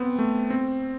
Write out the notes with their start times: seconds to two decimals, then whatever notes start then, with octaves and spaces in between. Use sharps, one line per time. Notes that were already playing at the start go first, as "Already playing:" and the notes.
Already playing: B3 C4
0.19 A3
0.50 C4